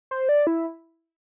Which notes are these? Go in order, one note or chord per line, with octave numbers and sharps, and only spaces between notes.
C5
D5
E4